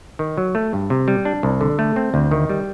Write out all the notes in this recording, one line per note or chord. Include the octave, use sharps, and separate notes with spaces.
D#3
F#3
A3
G2
C3
G3
D4
C2
D3
A3
C4
D2
D#3
G3